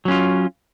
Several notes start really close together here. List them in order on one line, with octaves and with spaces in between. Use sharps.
F#3 C#4 F4